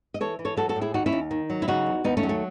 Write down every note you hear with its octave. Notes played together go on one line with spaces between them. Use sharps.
D#5
E3 A4 C#5
E3
A4 C#5
F#3 F#4 A4
F#4 A4
A2
E4 G#4
D#2 D#4 F#4
C#4 E4
D#2
D#3
F#3
E4
C#3 D#4 F#4
E2
D#2 B3 D#4
A3 C#4
F#3
A3